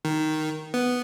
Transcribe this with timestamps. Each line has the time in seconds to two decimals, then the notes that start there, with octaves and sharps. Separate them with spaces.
0.05 D#3
0.74 B3